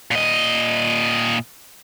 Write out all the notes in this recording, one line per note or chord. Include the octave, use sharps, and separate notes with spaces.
A#2 D#5